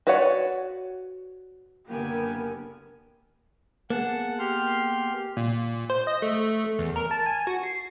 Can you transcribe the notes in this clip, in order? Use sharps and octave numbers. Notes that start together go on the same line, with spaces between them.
F#4 B4 C#5 D5 F#5
F#1 D3 A#3 B3 G4 A#4 G#5
A#3 B3 G#4 F#5 A5
G4 C6 F6
A#2
C5
D#5
A3
E2
A#4
A5
G#5
F#4
C7